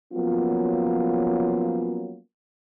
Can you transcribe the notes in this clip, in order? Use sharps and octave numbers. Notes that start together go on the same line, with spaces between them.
F3 F#3 A#3 B3 C#4 F4